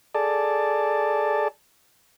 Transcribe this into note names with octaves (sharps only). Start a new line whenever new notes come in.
G#4 A4 D5 A5